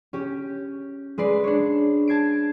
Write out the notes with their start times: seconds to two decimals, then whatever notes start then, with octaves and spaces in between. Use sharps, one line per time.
0.13 C#4 G4
1.18 G#3 B4 D5 C7
1.44 D4 C#5
2.08 A5 G#6 C7 D7